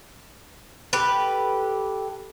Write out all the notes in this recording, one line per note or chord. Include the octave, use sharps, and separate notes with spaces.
G4 A4 B4